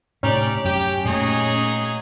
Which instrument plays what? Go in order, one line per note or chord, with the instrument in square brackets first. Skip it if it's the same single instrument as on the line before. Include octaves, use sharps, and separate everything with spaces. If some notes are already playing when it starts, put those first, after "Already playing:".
[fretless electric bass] A2 C3 [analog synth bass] C#4 [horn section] D#4 G4 D5
[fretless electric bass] F#2 [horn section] G4
[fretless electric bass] A#2 A3 [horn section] F#3 D#4 G#4